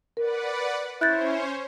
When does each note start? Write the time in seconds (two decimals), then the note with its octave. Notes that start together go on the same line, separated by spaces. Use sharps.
0.17 A#4 B4 D5 F#5
1.01 C#4 E4 C5 C#5 F#6 G6 A6